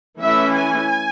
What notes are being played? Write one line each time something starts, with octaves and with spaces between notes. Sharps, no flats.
E3 A3 C#4 E4 E5
G#5